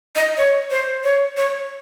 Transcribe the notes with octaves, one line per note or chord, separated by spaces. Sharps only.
D#5
C#5
C5
C#5
C#5